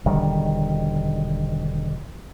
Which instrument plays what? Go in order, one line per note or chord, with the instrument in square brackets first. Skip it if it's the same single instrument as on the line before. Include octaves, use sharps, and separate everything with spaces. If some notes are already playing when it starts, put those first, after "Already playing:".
[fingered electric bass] E1 D3 D#3 G3